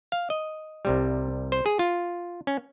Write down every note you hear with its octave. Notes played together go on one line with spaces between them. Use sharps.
F5
D#5
C2 C3 G3
C5
G#4
F4
C#4